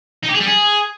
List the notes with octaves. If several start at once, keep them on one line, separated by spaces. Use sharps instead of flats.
D#4
G4
G#4
G3
G#4